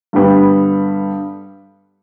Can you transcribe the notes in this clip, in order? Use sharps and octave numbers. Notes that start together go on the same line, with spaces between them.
G2 D3 G3 B3